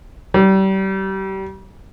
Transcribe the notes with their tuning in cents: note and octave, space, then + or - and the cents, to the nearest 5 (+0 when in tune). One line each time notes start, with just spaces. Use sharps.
G3 -30